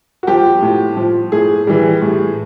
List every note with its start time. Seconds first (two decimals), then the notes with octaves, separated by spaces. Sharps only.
0.23 F#4
0.27 F3 G4
0.62 A2
0.97 F3
1.32 A2 G#4
1.67 E3 G3
2.02 A2